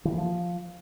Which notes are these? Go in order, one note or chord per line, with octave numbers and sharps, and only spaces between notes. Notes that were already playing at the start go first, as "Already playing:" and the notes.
E3
A#3
F3